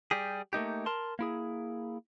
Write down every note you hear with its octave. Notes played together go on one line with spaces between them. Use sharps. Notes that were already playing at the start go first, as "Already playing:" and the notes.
G3 G4 G#4
A3 A#3 D#4 G4
A#4 A5 C6
A#3 E4 G#4